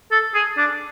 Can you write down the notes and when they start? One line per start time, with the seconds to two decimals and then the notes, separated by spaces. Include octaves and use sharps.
0.11 A4
0.35 G#4
0.58 D4